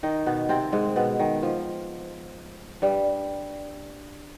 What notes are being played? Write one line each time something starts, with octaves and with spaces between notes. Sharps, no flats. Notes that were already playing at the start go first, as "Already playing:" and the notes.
D#3 D#4
B2 B3
C3 C4
G#2 G#3
B2 B3
D#3
F3
G2 G3